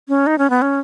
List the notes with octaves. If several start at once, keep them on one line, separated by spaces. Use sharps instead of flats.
C#4
D#4
C#4
B3
C#4